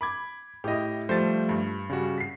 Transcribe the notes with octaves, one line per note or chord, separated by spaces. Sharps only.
B5 D6 G#6
A2 E4 G4 D#5
F3 G3 A3 C5 A6
G2
C#3 G3 F#4
B6 C7